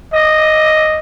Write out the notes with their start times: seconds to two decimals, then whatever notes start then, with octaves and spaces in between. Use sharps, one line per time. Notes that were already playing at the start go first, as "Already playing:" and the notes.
0.14 D#5